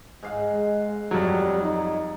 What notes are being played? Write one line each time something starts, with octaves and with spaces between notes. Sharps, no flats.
G#2 F5 F#5
G#3
F2 F#3 G3
D#4